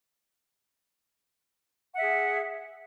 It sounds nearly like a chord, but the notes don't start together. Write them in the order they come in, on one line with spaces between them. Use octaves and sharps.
F#5 E5 G#4